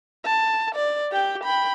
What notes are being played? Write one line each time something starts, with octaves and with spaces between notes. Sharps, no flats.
A5
D5
G4 G5
G5 B5